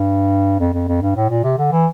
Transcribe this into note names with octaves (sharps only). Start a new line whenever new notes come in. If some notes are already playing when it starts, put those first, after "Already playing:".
Already playing: G2
F2
F2
F2
G2
A2
A#2
C3
D3
E3